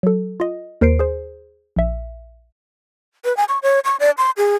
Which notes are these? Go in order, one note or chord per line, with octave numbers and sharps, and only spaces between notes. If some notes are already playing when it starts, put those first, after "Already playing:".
F#3 A4
F4 D#5
D#2 A#4 C5 C7 D7
G#4 C5
A#1 E5
B4
G#5
C#6
C#5
C#6
D5
C6
G#4